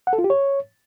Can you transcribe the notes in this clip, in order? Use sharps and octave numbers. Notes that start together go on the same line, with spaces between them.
F#5
A4
F4
G4
C#5